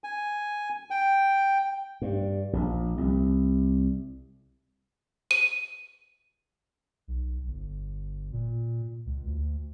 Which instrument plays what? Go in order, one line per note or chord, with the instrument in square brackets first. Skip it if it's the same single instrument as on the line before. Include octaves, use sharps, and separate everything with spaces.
[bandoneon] G#5
G5
[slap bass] G2
A#1
C2
[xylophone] D#7
[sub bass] B1
G1
A#2
C#2
D2